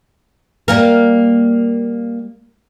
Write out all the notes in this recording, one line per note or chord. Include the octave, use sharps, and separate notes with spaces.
G3 A#3 A#4